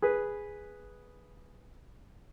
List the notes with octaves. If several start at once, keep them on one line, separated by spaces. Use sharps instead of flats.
G#4 B4